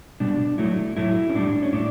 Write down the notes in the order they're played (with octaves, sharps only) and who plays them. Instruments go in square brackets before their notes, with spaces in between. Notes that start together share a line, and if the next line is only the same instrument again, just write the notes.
[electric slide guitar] B2 G3 D4
A2 F#3 A3 E4
A2 F#3 A3 E4
C#4
A2 G3 D4
C#4
A2 D4